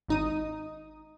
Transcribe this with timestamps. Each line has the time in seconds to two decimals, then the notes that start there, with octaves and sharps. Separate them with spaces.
0.08 G#1 D#4 D#6